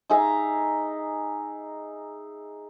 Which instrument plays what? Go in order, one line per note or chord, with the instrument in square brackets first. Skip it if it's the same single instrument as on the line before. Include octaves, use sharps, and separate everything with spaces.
[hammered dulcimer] D#4 G#4 E5 A#5